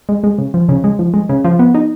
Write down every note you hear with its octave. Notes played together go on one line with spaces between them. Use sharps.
G#3
G#3
C#3
F3
C#3
G#3
F3
G#3
C#3
F3
B3
D#4